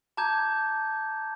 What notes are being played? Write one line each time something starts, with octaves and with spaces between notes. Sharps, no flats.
A5 A#5 D6 G6 G#6